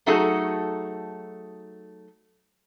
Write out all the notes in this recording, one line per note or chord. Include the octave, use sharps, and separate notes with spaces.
F#3 A3 D#4 F#4 G#4 A4